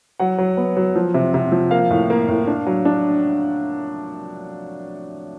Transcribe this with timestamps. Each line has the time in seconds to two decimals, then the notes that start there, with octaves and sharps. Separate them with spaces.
0.20 F#3 F#5
0.38 F#3
0.57 B3
0.77 F#3
0.95 F3
1.14 C3
1.34 C3
1.52 F3
1.71 A#3 F5
1.90 A2
2.10 A#3
2.28 A2
2.47 D4
2.66 F#3
2.85 D4